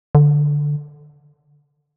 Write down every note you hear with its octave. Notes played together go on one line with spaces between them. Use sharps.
D3